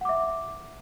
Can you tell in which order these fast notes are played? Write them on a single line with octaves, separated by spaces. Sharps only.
F#5 D6 E5